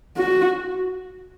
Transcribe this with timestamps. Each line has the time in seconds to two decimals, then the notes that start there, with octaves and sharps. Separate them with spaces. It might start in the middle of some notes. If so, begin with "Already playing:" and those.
0.17 F#4